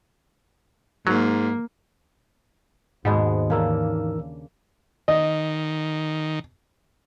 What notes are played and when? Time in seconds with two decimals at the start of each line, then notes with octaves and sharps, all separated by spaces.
1.07 G#2 F#3 A#3
3.05 D#2 G#2 B2 G#3 B3
3.50 C#3 E3 A#3 D4 A#4 E6
5.08 D#3 D#5